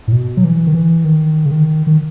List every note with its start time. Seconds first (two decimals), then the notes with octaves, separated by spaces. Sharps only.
0.08 A2
0.12 B2
0.37 F#3
0.44 E3
0.67 D#3
0.74 E3
1.05 D#3
1.46 C#3
1.51 D#3
1.87 D#3